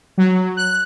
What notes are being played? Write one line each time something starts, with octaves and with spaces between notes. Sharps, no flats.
F#3
F#6